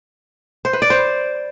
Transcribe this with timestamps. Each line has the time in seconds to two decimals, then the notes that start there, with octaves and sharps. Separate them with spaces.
0.65 C5
0.73 B4
0.82 D5
0.90 C5